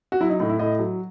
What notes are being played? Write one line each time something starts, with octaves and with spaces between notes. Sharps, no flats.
F#4
F#3 E4
D#4
A2 D#4
E4
A2 D#5
F#3